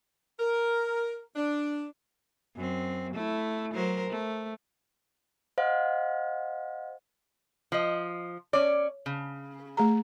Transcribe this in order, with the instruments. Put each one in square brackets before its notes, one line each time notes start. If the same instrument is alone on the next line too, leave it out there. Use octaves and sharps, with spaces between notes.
[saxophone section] A#4
D4
[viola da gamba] F#2 C4
A3 E4
F#3 A#4 C5
A3
[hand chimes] C5 D#5 F5 F#5
[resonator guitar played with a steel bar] F3 D#5
[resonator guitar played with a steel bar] C#4 D5 [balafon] C#5
[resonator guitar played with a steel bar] C#3
[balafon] A3 G#4 A#5